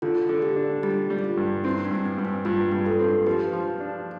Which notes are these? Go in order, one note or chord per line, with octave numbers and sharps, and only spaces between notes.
D3 F4 A4
D3
G4
D4
G3 G4
G3
F4
G2
C4 E4
D4
G2
C4
G2
D4
G2 F4
G2
F4 A4
C4
F3 G4 B4
F3
D4